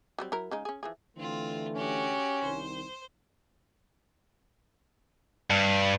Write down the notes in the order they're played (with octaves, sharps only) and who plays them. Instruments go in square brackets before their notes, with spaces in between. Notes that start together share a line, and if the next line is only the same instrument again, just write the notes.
[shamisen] F#3 G3 C4
F#3 E4 A#4
C#3 G#3 D#4
C#4 G#4
E3 F3 G#4
[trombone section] D3 E3 A3 [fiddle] C4 F4
[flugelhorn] C#4 [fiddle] F#4 G4
[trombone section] C2 D#3 [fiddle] C5
[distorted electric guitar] G2